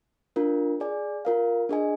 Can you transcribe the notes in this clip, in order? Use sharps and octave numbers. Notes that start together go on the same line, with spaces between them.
D4 F4 A#4
G#4 D5 G#5
F4 A#4 F5
D4 G#4 D#5 G#5